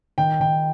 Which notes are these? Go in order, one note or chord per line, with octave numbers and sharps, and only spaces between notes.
D#3 G5
D#3 G5